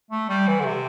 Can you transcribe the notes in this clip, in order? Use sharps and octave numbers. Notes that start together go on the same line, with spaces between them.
A3
G3
E3
D3
C3